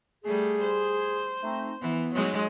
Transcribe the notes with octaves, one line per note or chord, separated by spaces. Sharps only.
G3 A3 G#4
C5
A3 C4 D#4
E3 B3
F#3 G#3 D#4